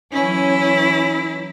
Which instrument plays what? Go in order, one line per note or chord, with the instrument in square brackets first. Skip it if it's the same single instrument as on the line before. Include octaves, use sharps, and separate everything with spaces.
[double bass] E3 F#3 [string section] C#4 [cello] E4